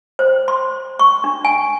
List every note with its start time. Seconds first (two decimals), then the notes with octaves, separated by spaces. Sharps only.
0.19 C5
0.48 C6
0.99 C#6
1.24 D4
1.45 G#5